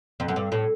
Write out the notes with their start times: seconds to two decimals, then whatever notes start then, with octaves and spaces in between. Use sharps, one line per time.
0.20 F2
0.28 F#2
0.36 G2
0.52 A2